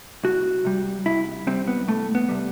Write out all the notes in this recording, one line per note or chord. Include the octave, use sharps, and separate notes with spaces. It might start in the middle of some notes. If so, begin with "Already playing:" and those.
C2 F#4
C3 G3
C2 E4
C3 G3 C4
B3
C2 A3
B3
C3 G3